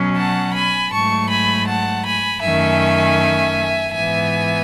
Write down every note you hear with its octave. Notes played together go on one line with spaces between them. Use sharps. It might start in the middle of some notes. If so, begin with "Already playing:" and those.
Already playing: B2 F#3 C#4
F#5 A5
G#5 B5
G#2 F#3 A3 A5 C#6
G#5 B5
F#5 A5
G#5 B5
F#2 D#3 A3 C#4 E5 G#5
G#2 E3 B3 E5 G#5